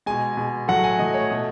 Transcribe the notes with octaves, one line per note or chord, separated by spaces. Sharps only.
B2 G#3 G#5
B2 G#3
A2 F#3 A3 F#5
G#5
A2 F#3 A3 D#5
C#5
B2 A3 D#5